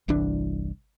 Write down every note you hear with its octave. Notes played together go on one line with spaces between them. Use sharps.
G1 C2 E3 D4